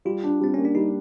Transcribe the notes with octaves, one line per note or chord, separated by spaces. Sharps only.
G3 F4
D4
G3 C4
A#3 C#4
D4
G3 D#4